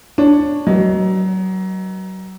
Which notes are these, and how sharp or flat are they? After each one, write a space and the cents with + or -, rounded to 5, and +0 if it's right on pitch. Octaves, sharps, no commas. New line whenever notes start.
D4 +0 C#5 +0
F#3 +25 B4 -35 D#5 +0